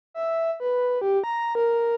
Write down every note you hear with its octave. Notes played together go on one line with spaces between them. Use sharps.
E5
B4
G4
A#5
A#4